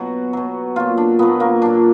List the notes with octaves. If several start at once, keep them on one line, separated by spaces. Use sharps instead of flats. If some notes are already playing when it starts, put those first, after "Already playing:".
Already playing: B2 F#3 F#4
B2 F#3
A#2 F#3 F4
D4
A#2 F#3 B3
A#3
A#2 F#3 D4